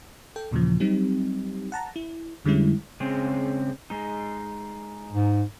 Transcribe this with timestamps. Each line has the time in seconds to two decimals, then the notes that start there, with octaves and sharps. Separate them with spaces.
0.36 A4 G5
0.51 D#2 A#2 C#3 E3 F3
0.80 F#3 G3 C4 D#4 G4
1.72 F#5 A5 A#5
1.96 E4
2.45 F2 D3 G3 G#3 C#4 E4
3.00 C#3 G#3 C4
3.90 G#3 D#4
5.13 G#2